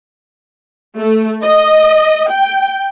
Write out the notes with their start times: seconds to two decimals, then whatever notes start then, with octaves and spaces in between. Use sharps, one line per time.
0.97 A3
1.43 D#5
2.30 G5